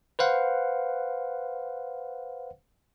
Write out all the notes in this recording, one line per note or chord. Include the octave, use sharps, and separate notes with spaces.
B4 C5 F5 F#5